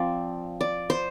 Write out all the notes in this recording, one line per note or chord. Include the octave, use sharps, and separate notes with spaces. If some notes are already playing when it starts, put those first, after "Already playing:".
Already playing: F3 C4 D5
D5
C5